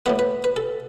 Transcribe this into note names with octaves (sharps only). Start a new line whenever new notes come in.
A2 E3 B3 B4
B4
B4
A4